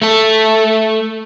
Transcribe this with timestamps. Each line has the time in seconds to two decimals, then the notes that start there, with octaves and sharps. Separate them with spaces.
0.02 A3 A4